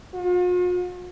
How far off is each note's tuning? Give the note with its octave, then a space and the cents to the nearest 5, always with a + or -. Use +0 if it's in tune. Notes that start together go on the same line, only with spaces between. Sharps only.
F4 +45